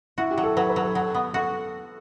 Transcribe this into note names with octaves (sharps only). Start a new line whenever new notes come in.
E4 F#4
G4
F#3
A4
F#3 B4
B4
F#3
A4
F#3 A4
B3
F#4 A4